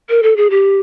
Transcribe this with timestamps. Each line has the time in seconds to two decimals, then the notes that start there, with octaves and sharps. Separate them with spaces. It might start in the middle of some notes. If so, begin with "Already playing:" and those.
0.10 A#4
0.23 A4
0.37 G#4
0.50 G4